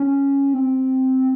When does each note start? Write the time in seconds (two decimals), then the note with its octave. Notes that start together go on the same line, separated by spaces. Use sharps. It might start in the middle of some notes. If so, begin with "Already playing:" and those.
Already playing: C#4
0.53 C4